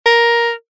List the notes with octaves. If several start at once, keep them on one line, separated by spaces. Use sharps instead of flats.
A#4